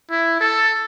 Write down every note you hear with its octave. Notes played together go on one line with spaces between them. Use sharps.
E4
A4